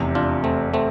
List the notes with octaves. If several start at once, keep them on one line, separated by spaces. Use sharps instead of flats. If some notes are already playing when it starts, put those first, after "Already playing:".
Already playing: F1 E2 C3
D4 F4
A3 C4
A3 C4